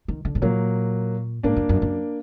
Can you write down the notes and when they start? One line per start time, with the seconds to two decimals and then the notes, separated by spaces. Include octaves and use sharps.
0.08 D#3
0.25 D3
0.35 G#2
0.42 A#2 F#3 A#3
1.43 G#2 A#3 D4
1.56 F#2
1.69 F#2
1.82 F#2